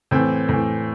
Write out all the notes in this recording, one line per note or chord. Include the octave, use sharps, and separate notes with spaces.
A2 E3 C4
A2 E3